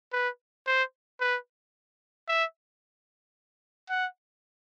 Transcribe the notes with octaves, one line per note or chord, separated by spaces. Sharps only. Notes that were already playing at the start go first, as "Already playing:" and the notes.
B4
C5
B4
E5
F#5